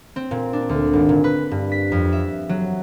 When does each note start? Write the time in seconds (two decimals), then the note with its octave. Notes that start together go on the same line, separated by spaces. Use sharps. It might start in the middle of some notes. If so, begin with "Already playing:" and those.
0.16 C4
0.31 A#2
0.53 D4
0.69 D2
0.93 G#1
1.09 A#2
1.24 B4
1.51 G2
1.72 B6
1.92 F2
2.12 E5
2.49 F#3